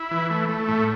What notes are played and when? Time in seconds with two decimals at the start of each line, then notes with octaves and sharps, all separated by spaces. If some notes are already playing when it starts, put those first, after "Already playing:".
Already playing: E4
0.11 E3
0.30 A3
0.49 A3
0.69 A2